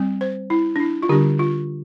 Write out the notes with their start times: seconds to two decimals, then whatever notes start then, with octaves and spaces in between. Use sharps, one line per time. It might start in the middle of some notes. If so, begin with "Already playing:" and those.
Already playing: G3 C4
0.21 C5
0.50 E4
0.76 D4
0.80 E4
1.02 F4
1.09 D3 G3 D4 G4
1.39 F4